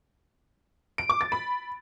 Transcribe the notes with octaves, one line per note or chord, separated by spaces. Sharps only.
D7
D6
A6
B5